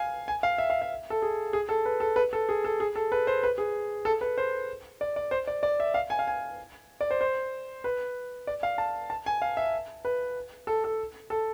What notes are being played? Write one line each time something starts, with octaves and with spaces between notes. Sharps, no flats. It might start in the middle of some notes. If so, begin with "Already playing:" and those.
Already playing: F5 G#5
G#5
F5
E5
F5
E5
A4
G#4
G#4
A4
B4
A4
B4
A4
G#4
A4
G#4
A4
B4
C5
B4
G#4
A4
B4
C5
D5
D5
C5
D5
D5
E5
F5
G#5
F5
G#5
D5
C5
C5
B4
D5
F5
A5
A5
G#5
F5
E5
B4
A4
A4
A4